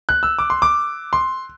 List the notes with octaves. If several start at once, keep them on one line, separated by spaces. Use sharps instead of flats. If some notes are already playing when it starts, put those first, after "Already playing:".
F#6
E6
D6
C6
D6
C6